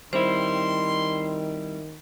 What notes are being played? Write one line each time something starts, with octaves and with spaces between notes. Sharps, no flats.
D#3 G3 C4 E4 C5 C6